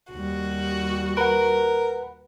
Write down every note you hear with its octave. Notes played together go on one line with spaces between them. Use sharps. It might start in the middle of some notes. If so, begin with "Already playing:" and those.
D#2 G3 F#4
A#4 B4 F#5